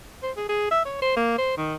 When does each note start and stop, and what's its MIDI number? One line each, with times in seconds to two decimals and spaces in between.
0.23 0.31 72
0.37 0.49 68
0.49 0.71 68
0.71 0.81 76
0.85 0.97 73
1.02 1.15 72
1.16 1.34 58
1.38 1.56 72
1.57 1.75 51